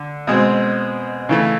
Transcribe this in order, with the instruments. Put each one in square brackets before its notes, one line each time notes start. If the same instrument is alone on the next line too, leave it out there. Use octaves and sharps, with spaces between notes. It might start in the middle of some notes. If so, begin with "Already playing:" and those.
Already playing: [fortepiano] D3
B2 G#3 C4
C#3 E3 A3